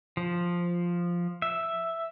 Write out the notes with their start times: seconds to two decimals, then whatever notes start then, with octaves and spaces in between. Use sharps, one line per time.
0.17 F3
1.42 E5